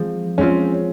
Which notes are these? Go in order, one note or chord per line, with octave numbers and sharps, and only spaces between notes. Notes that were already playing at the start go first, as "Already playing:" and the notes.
Already playing: F3 G#3 C4
G#3 C4 C#4 F4